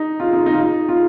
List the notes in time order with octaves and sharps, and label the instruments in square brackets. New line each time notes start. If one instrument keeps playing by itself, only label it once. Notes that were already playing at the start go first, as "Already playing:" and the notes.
Already playing: [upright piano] D#4
F4
D#4
D#4
F4
D#4
F4